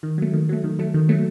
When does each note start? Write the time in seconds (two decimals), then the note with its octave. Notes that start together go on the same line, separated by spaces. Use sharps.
0.03 D#3
0.18 F#3 A3
0.34 D#3
0.49 F#3 A3
0.64 D#3
0.79 F#3 A3
0.94 D#3
1.09 F#3 A3